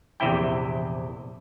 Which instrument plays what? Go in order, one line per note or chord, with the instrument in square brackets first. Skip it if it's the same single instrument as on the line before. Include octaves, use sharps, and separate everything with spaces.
[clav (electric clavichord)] A#1 E2 C3 E4 G5